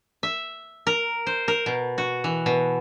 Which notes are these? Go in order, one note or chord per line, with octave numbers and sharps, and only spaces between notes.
E5
A#4
C5
A#4
B2
F#4
E3
B2